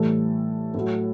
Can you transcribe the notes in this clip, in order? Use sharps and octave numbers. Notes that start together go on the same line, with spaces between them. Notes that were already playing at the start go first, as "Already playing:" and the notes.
Already playing: A2 E3 G3 A3 A4
A2 F#3